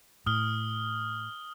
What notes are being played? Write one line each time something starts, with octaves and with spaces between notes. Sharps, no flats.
A2 D#6 F6 G7